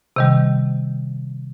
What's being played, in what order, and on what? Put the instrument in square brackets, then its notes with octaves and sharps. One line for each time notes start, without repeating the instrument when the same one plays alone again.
[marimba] C3 D#3 G3